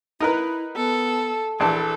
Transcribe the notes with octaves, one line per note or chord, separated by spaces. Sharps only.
D#4 E4 A#4 B4
B3 A4
A#1 E3 A4 D5 A5